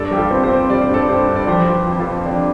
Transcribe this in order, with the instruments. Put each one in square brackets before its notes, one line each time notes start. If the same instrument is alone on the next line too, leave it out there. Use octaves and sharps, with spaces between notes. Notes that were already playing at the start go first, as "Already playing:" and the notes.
Already playing: [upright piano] G2 [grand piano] A4 D5
[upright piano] G3 [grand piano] G4
[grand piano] F4 A4
[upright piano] C4
[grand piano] G4 C5
[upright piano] C4
[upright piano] G3 [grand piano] D5
[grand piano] C5
[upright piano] G2 [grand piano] A4 D5
[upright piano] G2 [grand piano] G4 C5
[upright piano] G2
[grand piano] D5
[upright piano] F3 [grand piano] G4 C5
[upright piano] F4
F2
[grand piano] F4 A4
[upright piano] C4
[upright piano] F3 [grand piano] D4 G4